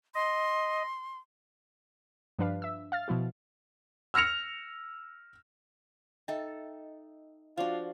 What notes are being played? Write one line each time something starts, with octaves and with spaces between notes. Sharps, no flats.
D#5 C6
G2 F3 D4 B4 F5
E5 E6
F5 F6 A6
B2 F3 E4 F#4
E6 F6 A#6 C#7 F7
D#4 A4 D#5 E5 G5
F3 D4 F4 F#4 D5 F5